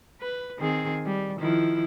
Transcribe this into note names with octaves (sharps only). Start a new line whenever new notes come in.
B4
D#3 C4 G#4
G3
D#3 F3 E4